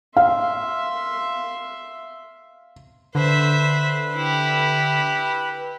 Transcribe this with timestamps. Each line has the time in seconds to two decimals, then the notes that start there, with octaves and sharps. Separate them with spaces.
0.16 E5 F5 C6
3.15 D3 B4 C5 E5
4.15 E4 G4